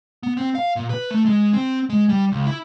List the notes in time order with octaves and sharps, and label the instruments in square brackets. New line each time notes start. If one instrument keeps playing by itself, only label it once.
[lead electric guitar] B3
C4
F5
A#2
B4
A3
G#3
C4
G#3
G3
C#2
E4